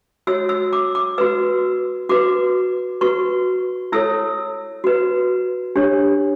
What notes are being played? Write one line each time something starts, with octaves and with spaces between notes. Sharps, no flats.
F#4 C#5 E6
E6
D6
D6
F#4 B4 E6
F#4 B4 D6
F#4 B4 C#6
E4 A4 C#5 E6
F#4 B4
D4 G4 C#5